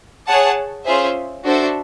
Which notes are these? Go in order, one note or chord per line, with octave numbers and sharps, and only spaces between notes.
G#4 C#5 F#5 A5
C#4 F4 G#4 C5 E5
D4 F#4 A4 C5 E5